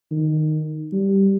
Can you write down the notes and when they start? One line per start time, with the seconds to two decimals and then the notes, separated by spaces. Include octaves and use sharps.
0.11 D#3
0.92 G3